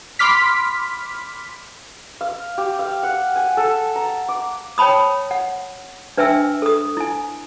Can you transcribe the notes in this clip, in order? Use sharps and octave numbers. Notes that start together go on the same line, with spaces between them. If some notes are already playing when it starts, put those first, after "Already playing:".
B5 C6 D6 F6 B6
F5
G4
F5
F#5
G#5
A4
A#5
D6
C#5 G5 A5 B5 D#6
F#5
D4 B4 E5 G5 G#5 E6
A4 D#6
E4 G#5